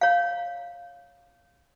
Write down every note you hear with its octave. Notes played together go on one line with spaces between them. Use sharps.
C#5 F5